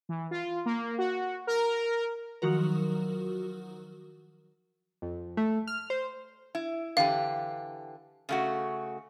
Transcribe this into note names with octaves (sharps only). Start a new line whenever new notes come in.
E3
F4
A#3
F#4
A#4
D#3 F3 F#3 F#4 A#4
F2
A3
F6
C5
E4
D3 E3 G4 F5
C#3 A3 F#4